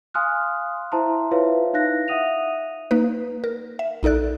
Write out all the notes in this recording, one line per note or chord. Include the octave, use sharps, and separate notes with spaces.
F5 G#5 C6 D#6 F6 F#6
E4 C5 E5 A5 A#5 C6
E4 F4 B4 C#5 E5 F5
D#4 F5 F#6 A#6
E5 F#5 D#6 D#7 F7
A#3 D#4 B4
A#4
E5
A#1 D#4 A4 D5 F#6